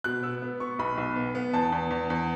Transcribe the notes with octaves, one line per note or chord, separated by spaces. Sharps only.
B2 F#6
B3 E6
B3
B3 C#6
B1 B5
B1
B3
B3
E2 A5
E2
E2
E2